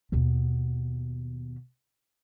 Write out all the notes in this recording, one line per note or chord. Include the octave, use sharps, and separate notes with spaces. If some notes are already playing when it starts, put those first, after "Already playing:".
D#2 B2